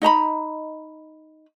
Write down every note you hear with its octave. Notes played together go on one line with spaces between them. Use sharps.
D#4 D#5 A#5 B5